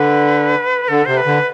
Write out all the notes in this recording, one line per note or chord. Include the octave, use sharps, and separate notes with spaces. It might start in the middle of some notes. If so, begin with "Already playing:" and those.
Already playing: D3 B4
D3 A4
C3 C5
B4
D3